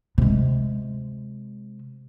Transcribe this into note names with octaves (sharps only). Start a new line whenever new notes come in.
C3 G#3